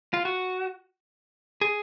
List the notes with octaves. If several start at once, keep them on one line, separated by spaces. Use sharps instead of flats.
F4
F#4
G#4